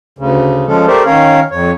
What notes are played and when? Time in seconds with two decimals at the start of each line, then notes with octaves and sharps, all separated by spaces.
0.19 D2 C#3
0.67 F3 G#3 C#4 A4
0.87 A3 G4 A#4 C5 D5 E5
1.06 D#3 C#4 A#4 C#5 F5
1.51 F2 C#5